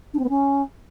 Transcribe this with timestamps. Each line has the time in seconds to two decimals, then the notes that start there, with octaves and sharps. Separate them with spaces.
0.13 D4
0.19 C4
0.24 B3
0.29 C#4